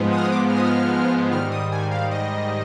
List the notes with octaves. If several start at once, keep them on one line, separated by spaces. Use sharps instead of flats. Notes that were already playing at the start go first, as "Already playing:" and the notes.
Already playing: G#2 F3 G#3 B3
D#6
F6
D#6
D6
F6
D#6
F6
G#2 D#3 G3 F6
D#6
G#5
F5
D#5